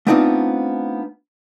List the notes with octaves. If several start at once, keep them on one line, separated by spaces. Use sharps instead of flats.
A3 B3 C4 D4 D#4 F4